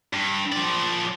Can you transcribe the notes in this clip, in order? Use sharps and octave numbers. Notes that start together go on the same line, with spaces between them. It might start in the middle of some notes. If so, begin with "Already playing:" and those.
G2
F3 D5